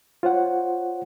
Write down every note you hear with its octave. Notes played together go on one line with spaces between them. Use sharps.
F4 C5 C#5 F#5